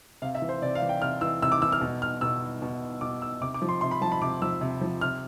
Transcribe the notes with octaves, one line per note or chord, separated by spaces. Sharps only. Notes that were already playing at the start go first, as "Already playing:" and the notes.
C3 F5
E5
E3
C5
C3 D5
F5
E3
G5
C3 F6
E3 E6
C3 E6
D6
E3 E6
F6
B2
F6
B2 E6
B2
B2 D6
E6
C3 D6
D6
F3
C6
C3 C6
B5
F3 A5
B5
C3 D6
F3 E6
C3
F3
C3 F6